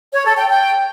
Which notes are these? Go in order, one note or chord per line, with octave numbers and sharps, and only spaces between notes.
C#5
A4
G5
G5